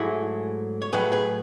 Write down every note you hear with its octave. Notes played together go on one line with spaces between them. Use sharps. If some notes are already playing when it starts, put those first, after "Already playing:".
Already playing: G#2 F#3 A3 E4 G#4
C#5
A2 F#3 A3 G#4 B4
G#4 B4